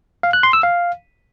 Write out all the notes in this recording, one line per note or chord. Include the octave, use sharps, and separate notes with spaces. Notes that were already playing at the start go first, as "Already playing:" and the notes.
F5
F#6
C6
E6
F5